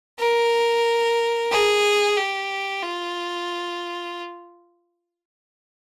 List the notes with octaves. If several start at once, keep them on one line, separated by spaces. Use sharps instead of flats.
A#4
G#4
G4
F4